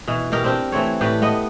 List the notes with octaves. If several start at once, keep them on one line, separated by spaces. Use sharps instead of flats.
B2 E3
B2 G4 A#4
C4 D4 G4 A#4
E3 A3 C4 C#5
A2 G4 B4 D5
A3 B3 D#5